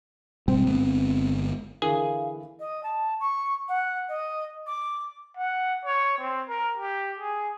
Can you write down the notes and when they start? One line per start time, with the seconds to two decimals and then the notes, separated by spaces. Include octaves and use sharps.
0.48 G#1 B2 G3 C4
0.66 G1 G#3 B3
1.82 D3 E3 G#4 A#4 F5
2.60 D#5
2.83 A5
3.20 C#6
3.69 F#5
4.09 D#5
4.67 D6
5.37 F#5
5.85 C#5
6.18 C4
6.49 A#4
6.77 G4
7.19 G#4